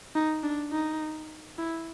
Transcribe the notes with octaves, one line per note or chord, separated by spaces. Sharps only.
D#4
D4
D#4
E4